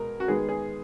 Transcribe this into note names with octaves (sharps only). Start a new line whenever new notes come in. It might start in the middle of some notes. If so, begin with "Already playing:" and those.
Already playing: B2 G#3 A#4
F#4
D#3 G#3 B3 G#4
G#4